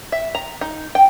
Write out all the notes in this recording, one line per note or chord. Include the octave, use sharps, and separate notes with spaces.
E5
A#5
D#4
G5